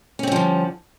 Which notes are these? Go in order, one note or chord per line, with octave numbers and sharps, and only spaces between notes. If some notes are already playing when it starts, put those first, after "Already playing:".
D3 F3 G3 C4 C#4